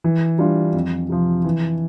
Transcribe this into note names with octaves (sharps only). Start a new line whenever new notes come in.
E3
G3 D4 F4
F2
C3 F3
E3